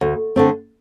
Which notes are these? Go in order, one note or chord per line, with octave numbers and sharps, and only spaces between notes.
D2
D3 A3 C4